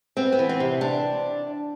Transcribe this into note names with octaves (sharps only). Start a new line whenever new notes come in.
B3 C4
B3
E3
C4
C3
C3 D4